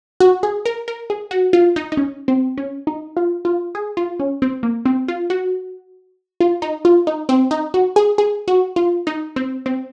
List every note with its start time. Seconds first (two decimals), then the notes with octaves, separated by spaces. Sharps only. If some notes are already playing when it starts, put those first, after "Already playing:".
0.20 F#4
0.43 G#4
0.65 A#4
0.88 A#4
1.10 G#4
1.31 F#4
1.53 F4
1.76 D#4
1.92 D#4
1.97 C#4
2.28 C4
2.58 C#4
2.87 D#4
3.17 F4
3.45 F4
3.75 G#4
3.97 F4
4.20 C#4
4.42 C4
4.63 A#3
4.85 C4
5.08 F4
5.30 F#4
6.40 F4
6.62 D#4
6.85 F4
7.07 D#4
7.29 C4
7.51 D#4
7.74 F#4
7.96 G#4
8.18 G#4
8.48 F#4
8.76 F4
9.07 D#4
9.36 C4
9.66 C4